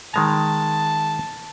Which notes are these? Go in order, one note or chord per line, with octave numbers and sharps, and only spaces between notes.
D#3 G#3 A5 A#5